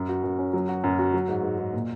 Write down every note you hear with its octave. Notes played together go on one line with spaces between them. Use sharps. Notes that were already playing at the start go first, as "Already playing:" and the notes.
Already playing: F#2
F#4
F#2
C#4
F#3
F#4
F#2
F#4
F#3
G#2
G#2
G#2
A#2